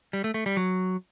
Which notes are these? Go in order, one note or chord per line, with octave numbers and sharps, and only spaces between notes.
G3
A3
A3
G3
F#3